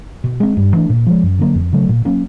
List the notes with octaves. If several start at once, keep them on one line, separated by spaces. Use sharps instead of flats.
B2
G#3 C4
G2
E3 A3 D4
A#2
F3 G#3
F#2
D3 F#3 A#3
F2
C#3 F#3 A3
A#2
F#3 A#3 C#4